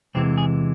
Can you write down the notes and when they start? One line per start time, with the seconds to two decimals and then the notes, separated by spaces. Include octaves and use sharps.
0.15 E2 C3 E3 G#3 C4
0.38 G#4